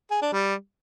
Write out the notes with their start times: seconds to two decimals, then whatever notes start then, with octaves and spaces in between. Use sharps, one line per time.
0.11 G#4
0.22 D4
0.33 G3